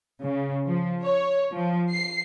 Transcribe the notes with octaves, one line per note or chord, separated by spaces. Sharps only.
C#3
F3
C#5
F3
C7